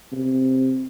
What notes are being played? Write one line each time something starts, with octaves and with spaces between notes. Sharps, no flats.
C3